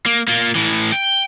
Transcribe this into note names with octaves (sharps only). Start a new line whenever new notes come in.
A#3
A#3 F4
A2 E3
G5